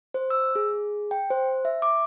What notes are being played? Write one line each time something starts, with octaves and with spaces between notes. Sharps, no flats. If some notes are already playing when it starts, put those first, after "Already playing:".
C5
E6
G#4
G5
C5
E5
D6